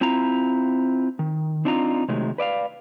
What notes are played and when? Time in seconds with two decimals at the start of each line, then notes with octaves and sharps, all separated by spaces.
0.01 C4 E4 F4 A#5
1.19 D#3
1.65 C4 D4 D#4 F4 A#5
2.08 C3 D#3 F#3 G#3 A3
2.38 B4 D5 E5 F5